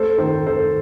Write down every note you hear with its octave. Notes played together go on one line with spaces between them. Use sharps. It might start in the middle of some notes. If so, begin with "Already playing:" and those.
Already playing: A3 A4 C5
D#3 A4 C5
D#3 A4 C5